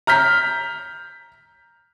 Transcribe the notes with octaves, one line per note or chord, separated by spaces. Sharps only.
A#5 F6 G6 B6